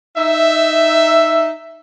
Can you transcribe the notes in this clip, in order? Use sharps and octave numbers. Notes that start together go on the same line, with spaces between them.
D#4 E5